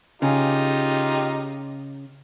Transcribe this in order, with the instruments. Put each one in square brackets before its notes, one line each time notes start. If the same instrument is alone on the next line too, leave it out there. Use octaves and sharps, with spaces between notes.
[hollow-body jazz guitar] C#3 [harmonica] D#4 F4 G4